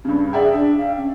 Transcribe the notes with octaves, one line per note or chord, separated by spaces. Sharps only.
G2 C#3 D4
G#4 D5 E5 G5
D4
F5
C#4